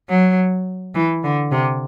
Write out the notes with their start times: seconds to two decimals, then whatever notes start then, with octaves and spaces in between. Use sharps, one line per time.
0.09 F#3
0.95 E3
1.24 D3
1.51 C3